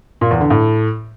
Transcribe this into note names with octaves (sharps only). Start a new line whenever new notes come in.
A#2
E2
D3
A2